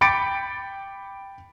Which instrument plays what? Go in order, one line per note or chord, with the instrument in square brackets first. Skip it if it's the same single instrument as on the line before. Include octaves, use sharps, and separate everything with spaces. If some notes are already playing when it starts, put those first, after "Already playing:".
[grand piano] G5 B5 D6 A6 C#7 D7